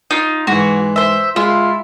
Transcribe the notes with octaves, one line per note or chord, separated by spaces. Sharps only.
D#4 F4
G#2 E3 F#4
C5 E5
G#3 E4 F4